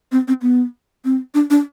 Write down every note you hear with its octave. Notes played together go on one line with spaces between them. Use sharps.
C4
C4
B3
C4
D4
D4